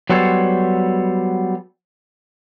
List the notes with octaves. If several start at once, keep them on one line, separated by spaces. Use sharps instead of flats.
F#3 G3 B3 A4 C5 C#5